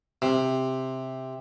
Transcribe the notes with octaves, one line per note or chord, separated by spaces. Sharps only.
C3